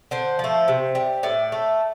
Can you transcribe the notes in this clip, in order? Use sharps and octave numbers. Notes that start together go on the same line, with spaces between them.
D3 C5
F3 A3
C3
G3
A2 D5
A3